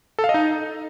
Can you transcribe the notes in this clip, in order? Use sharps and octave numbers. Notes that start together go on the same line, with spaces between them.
A4
F5
D#5
D#4